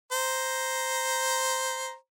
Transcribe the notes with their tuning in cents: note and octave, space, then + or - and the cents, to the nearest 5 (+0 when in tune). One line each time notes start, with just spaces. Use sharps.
C5 +0 A#5 +5